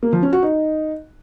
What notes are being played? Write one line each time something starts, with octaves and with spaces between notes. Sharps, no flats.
A#3
F3
C#4
F#4
D#4